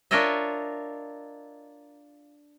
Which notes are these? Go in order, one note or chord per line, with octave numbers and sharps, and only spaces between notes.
D4 F4 A#4 C#5 D#5 E5